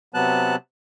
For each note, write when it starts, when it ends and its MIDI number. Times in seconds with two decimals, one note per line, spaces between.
0.14 0.56 48
0.14 0.56 54
0.14 0.56 59
0.14 0.56 81
0.14 0.56 90